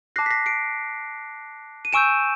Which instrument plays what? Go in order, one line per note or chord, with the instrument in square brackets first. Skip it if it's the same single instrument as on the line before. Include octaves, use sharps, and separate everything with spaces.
[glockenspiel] A5 D6 F#6 A#6 C7
B6
A#6 C7
C7 D7
D#7
G#5 C#6 E6 G6 D7 E7